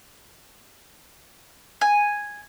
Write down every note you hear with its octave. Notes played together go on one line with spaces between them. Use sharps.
G#5